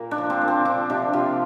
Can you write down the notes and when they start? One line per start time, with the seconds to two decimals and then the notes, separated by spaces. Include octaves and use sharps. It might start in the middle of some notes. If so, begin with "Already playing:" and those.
Already playing: A#2 A#3
0.11 D4
0.18 F3
0.30 C4
0.41 A#2
0.48 C4
0.65 F3 D4
0.90 C3 D4
1.13 C3 F4